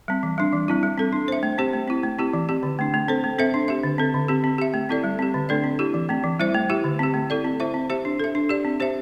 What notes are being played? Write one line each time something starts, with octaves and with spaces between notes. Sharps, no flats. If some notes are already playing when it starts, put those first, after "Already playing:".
G3 C4
E3
G3 D4
E3
G3 C4 E4
G3
C4 A4
D4
C5 E5
A3
C4 G4 C5
A3
C4 E4
A3
C4 E4 G4
E3
C4 G4
D3
A3 D4
A3
C4 A4 C5
A3
C4 A4 C5 E5
D4
G4 E5
D3
C4 A4
D3
C4 G4
C4
G4 E5
A3
C4 E4 A4 D5
G3
C4 G4
D3
A3 D4 A4 D5
C4
E4 G4
E3
A3 C4
E3
G3 E4 C5 E5
A3
E4 G4 E5
D3
C4 G4
A3
E4 A4 D5
C4
E4 C5 E5
C4
G4 C5 E5
D4
A4 E5
D4
G4 D5
C4
G4 C5 E5